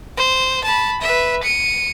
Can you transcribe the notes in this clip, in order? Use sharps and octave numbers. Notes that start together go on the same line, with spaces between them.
C5
A5 B5
B4 E5
C#7 D#7